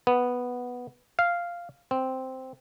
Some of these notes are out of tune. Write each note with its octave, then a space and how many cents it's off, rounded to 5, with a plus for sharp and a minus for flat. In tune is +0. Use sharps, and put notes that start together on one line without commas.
B3 -5
F5 -5
C4 -5